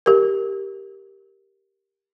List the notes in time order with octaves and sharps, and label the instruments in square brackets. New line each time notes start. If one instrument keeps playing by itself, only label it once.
[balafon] G4 A#4